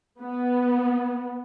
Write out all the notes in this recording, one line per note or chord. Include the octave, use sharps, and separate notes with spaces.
B3